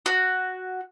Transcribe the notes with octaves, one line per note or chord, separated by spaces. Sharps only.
F#4